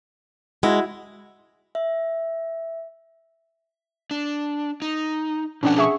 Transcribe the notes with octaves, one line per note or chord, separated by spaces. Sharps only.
G#3 E4 F#4
E5
D4
D#4
B2 F3 C#4 D4 A4 F#5
G#4 E5 C#6